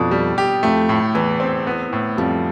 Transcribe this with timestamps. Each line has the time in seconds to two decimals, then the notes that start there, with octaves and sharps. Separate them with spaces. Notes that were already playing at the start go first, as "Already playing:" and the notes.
Already playing: F2 B2 D4
0.11 G3
0.38 G4
0.63 F2 A3
0.89 A2
1.15 E2 E3
1.40 C4
1.67 B3
1.93 A2
2.17 F2 G3